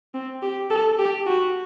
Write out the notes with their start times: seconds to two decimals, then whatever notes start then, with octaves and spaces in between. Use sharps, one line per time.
0.14 C4
0.42 G4
0.70 A4
0.99 G4
1.27 F#4